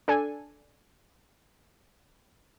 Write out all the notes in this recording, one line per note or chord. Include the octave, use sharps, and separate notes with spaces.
D4 A4 G#5